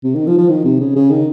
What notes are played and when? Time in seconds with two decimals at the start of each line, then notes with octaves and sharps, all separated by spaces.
0.04 C3
0.15 D#3
0.27 F3
0.38 F3
0.49 D#3
0.64 C3
0.80 C#3
0.95 C#3
1.10 D#3